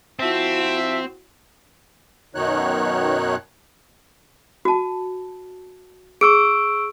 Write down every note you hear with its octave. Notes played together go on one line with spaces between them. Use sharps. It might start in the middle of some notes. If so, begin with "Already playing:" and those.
F3 C4 E4 F#4 E5
F#2 B2 D#3 D#4 C#5 F#6
F#4 A5
G#4 C#6 E6 D7